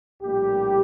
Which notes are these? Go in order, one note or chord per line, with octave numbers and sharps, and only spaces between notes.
A#1 A2 G3 A#3 G4